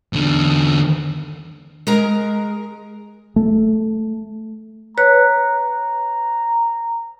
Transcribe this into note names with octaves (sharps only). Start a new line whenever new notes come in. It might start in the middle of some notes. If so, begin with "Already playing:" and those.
E2 D3
G#3 G#4 A#4 A#5
A3
B4 C#5 A#5 F#6